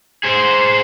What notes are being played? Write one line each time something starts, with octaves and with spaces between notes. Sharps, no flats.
G#4 C5